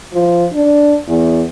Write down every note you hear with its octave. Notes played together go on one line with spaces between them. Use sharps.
F3
D4
E2